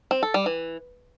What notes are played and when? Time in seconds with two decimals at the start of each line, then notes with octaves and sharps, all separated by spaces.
0.11 C4
0.23 A4
0.34 G3
0.46 E3